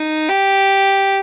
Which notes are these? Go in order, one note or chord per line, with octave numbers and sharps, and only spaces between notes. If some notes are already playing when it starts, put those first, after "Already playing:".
Already playing: D#4
G4